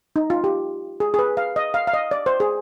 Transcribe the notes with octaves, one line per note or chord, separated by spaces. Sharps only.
D#4
F4
G4
G#4
G#4
B4
F5
D#5
F5
F5
D#5
D5
C5
G#4